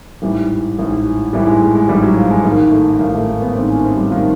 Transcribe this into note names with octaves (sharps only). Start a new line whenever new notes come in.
A1 G#2 E3 G3
A1 G#2 E3
A1 G#2 E3 G3
G#3
G#3
G#3
A1 G#2 E3 G3
F#3
F3
G#3
A1 G#2 D#3 A#3
A3
A1 G#2 D#3 A#3
A3
A#3
B3
A1 G#2 D#3 C4
C#4
C4
G3
D#3 F3